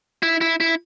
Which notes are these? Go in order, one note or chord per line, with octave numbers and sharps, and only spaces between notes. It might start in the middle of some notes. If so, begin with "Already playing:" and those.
E4
E4
E4